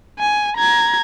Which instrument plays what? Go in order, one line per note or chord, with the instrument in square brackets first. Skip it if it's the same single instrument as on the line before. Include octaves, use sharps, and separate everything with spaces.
[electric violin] G#5
A#5 G#6